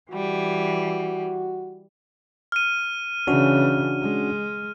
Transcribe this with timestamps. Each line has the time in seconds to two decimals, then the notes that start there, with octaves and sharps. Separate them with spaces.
0.11 E3 G3 F#4
2.52 F6 D#7
3.27 C#3 E3 C#4 D4 F#4
4.01 G#3